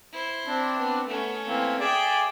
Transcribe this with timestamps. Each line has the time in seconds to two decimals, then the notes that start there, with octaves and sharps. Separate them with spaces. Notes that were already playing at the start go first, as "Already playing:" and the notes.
0.13 E4 C5
0.47 C4 D4
0.78 B3
1.07 A3 B3 C#4
1.46 E3 A#3 C4
1.80 G#4 D5 E5 G5